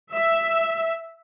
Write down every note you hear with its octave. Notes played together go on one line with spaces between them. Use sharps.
E5